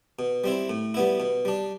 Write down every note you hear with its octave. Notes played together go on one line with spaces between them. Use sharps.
B2
G3 C4 E4
A2
G3 B3 E4
B2
G3 D4